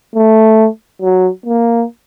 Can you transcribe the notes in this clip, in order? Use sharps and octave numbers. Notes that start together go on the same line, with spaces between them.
A3
F#3
A#3